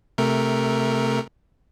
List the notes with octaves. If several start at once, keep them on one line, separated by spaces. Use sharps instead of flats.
C3 A3 A#4